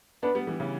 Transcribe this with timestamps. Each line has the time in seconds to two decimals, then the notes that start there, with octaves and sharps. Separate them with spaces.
0.23 B3 D4 B4
0.35 G3 B3
0.47 E3 G3
0.60 C#3 E3